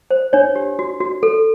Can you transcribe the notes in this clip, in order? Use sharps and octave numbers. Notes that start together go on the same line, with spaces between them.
C5
D4 C#5
G4
F#4
F#4
A4